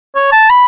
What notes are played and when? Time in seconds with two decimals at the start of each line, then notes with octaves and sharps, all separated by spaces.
0.15 C#5
0.32 A5
0.50 B5